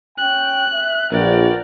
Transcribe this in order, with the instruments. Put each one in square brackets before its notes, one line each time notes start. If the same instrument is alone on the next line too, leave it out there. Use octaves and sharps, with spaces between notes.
[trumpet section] C#4 G5 [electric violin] F#6
[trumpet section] E5
[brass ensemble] A#1 [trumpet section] F#4 B4 G5 [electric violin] A#4 D5